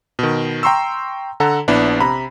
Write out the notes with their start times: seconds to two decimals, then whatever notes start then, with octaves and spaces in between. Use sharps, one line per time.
0.19 B2 D#3
0.63 G5 A#5 C6 C#6 E6
1.40 D3 A4 F#5 A#5
1.68 A#1 B3 D4 E4
2.00 C3 A#5 B5